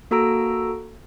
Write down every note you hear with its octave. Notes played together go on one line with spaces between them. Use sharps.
A#3 F#4 A4 A#5 E6 D7